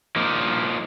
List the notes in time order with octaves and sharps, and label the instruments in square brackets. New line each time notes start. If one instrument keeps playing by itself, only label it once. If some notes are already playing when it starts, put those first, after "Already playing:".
[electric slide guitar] F3 A#3 D#4